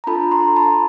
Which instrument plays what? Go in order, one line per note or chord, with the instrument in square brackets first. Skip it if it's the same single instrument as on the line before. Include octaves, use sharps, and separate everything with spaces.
[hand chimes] A#5
D4 F4 A4 A5 B5
A#5 C6
A5 B5